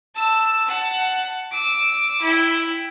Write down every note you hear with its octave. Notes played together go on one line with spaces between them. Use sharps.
A5 E6
F#5 A5
D6 E6
E4 G5